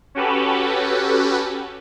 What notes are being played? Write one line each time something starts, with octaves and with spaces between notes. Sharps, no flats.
C#4 F#4 G4 A4 B4